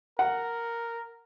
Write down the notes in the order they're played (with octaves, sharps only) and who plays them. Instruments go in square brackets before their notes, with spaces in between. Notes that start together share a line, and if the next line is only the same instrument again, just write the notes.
[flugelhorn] A#4 [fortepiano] F#5